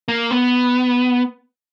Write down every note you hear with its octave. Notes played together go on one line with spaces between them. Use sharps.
A#3
B3